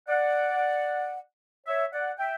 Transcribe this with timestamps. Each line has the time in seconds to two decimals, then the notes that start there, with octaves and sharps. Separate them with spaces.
0.09 D5 F#5
1.67 C#5 E5
1.92 D5 F#5
2.19 E5 G5